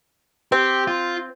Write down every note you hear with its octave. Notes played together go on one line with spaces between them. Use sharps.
C4 G4
F4